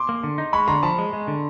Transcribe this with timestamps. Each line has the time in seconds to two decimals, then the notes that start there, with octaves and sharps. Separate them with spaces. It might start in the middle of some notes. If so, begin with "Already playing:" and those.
Already playing: C6 D6
0.09 A#3
0.24 D3
0.38 D#4
0.53 G#3 B5 C#6
0.68 D3 A#5 C6
0.83 F3 A5 B5
0.98 G#3
1.13 G#3
1.28 D3